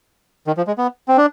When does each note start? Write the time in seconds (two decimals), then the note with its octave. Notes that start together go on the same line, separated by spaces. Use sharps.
0.47 D#3
0.57 F3
0.67 G#3
0.78 B3
1.08 C4
1.17 D4